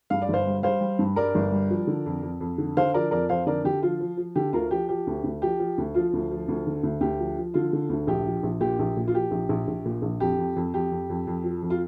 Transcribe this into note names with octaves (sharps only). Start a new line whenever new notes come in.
G2 F5
D5
G1 C5 F5
G3
G3 C5 F5
G3
G2
G3 A#4 D5
G1
G3
F3
D3
F2
F2
F2
D3
D3 C5 F5
F3 A#4 D5
F2 A#4 D5
F2 C5 F5
D3 A#4 D5
D3 G4
F3 F4
F3
F3
D3 G4
D2 F4 A#4
F3 G4
F3 G4
D2
D2
F3 G4
F3
D2
F3 F4
D2
F3
D2
D3
D2
D2 G4
F3
F3
D3 F4
D3
D2
A#1 G4
F3
A#1
A#2 G4
A#1
A#2
F4
F3 G4
A#1
A#1
A#1
A#2
A#1
F2 G4
F2
F2
F2 G4
F2
F2
F2
F3
F2
F4